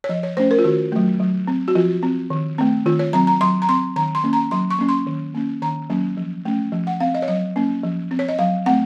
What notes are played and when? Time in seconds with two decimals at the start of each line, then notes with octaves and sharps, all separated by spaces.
0.04 C#5
0.09 F3 D#5
0.23 C#5
0.37 A3 C#4 C5
0.51 A#4
0.59 F4
0.64 D#3 F#4
0.92 F#3 A3
1.20 F#3
1.47 C4
1.68 F#4
1.75 F3 F4
2.03 C4
2.30 D#3
2.58 A3 C4
2.86 D#3 F4
2.99 C#5
3.13 F#3 C4 A#5
3.27 A#5
3.41 F#3 C6
3.62 A#5
3.69 C4 C6
3.96 D#3 A#5
4.15 C6
4.24 A#3 C#4
4.33 A#5
4.51 F#3 C6
4.71 C#6
4.79 A#3 C#4
4.89 C6
5.07 D#3
5.35 A#3 C#4
5.62 D#3 A#5
5.90 F#3 A#3 C#4
6.17 F3
6.45 A3 C#4
6.72 F3
6.87 F#5
7.00 C4 F5
7.15 D#5
7.22 C#5
7.28 F#3 D#5
7.56 A#3 C#4
7.83 F3
8.11 C4
8.19 C#5
8.29 D#5
8.39 F#3 F5
8.66 A3 C4 F#5